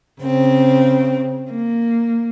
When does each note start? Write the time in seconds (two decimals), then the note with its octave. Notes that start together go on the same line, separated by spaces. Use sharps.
0.21 C#3 C4
1.51 A#3